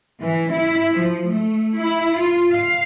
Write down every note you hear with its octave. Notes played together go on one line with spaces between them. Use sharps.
E3
E4
F3
A3
E4
F4
F5